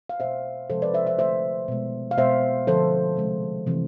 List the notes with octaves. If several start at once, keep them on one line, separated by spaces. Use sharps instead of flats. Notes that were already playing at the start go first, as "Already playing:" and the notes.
F5
B2 A3 C5 E5
C3 F3 G#3 A4 C5
B4 D5
C5 E5
C5 E5
D3 A3 C5 E5
B2 G#3
F5
B2 G#3 C5 E5
D3 F3 A3 A4 C5
C3 G#3
C3 E3 A3